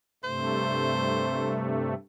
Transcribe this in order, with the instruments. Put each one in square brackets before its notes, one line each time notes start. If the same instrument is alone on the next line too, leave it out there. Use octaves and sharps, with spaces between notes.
[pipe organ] G2 C3 A3 [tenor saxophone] C5